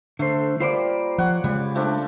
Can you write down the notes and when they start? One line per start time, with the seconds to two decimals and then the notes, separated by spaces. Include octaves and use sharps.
0.19 D3 A3 C5
0.60 G3 A#3 F4 C5 D5
1.18 F3 C#5 F#5
1.44 C#3 G3 G#3
1.75 F3 A3 D4